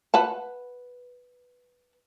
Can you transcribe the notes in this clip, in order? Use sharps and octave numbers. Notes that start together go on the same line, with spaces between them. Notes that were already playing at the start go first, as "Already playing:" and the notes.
B4 F#5 A5